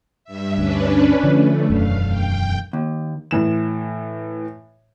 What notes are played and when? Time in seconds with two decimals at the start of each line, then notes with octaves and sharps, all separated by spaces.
0.24 G2 E5
0.58 D2 G2 C#4 D4 B4
1.23 D3 F3 A3
1.70 E1 F#2 D#3 F5
2.07 G5
2.73 D#2
3.31 A2 E3 E7